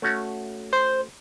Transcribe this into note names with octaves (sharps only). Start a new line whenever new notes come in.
A3 C#4 F#4
C5